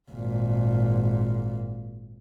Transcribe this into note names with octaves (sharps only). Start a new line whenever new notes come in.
G#1 A#2